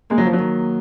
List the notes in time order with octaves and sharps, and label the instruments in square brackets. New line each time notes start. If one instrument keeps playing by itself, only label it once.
[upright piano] G#3 [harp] A#3
[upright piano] F#3
F3
F#3
[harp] D#3